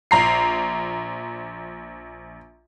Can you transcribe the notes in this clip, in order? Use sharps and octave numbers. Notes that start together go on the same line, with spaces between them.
A#1 A#5 C7